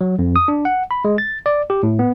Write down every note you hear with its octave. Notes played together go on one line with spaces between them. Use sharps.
F#3
F2
D#6
D4
F#5
B5
G#3
A6
D5
G4
A2
B3